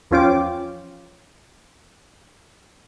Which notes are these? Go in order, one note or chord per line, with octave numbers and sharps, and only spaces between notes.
E2 F3 C#4 F4 G5 D6